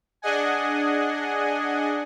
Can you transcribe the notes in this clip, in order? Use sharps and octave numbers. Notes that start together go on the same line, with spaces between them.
D4 G#4 D#5 F#5 G#5